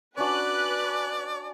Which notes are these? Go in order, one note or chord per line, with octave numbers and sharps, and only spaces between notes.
C#4 D4 F#4 B4 D5 F#6